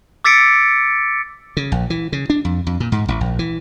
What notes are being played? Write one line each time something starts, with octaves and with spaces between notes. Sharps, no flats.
D6 E6 A6 B6 C#7 D7
C#3
A#1
E3
C#3
D4
F2
F2
A#2
G#2
A1
A#1
E3